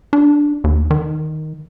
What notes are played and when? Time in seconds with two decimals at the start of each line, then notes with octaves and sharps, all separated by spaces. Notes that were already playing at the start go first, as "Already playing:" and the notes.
0.13 D4
0.64 D#2
0.91 D#3